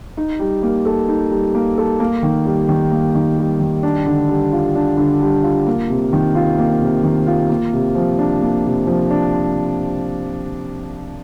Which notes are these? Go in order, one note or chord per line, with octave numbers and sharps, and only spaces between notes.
D#4
G3
A#3
A4
D#4
G3
A#3
A4
A#3
D#3
G3
D#3
A#3
D#3
G3
D#3
D4
D3
G3
F4
D4
D3
G3
F4
A#3
C3
D#3
F4
A#3
C3
D#3
F4
A#3
C3
F3
D4
A#3
C3
F3
D4